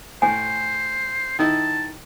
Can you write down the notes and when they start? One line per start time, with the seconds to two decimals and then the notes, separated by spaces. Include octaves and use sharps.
0.22 A2 C5 G#5
1.39 D#3 D#4 E4 A5